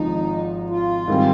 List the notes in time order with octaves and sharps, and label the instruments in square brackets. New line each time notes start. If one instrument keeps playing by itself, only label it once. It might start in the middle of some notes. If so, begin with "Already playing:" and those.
Already playing: [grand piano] G#1 G#2 F3 [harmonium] D#4
[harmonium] F4
[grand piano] G#2 D#3 G3 C4